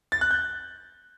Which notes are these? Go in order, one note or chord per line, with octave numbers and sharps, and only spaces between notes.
A6
F#6
G6